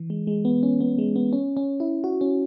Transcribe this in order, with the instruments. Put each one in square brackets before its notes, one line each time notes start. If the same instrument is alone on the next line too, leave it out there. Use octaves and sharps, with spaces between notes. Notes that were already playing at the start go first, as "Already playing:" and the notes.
Already playing: [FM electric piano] E3
G#3
G#3
B3
C#4
B3
G#3
B3
C#4
C#4
E4
F#4
C#4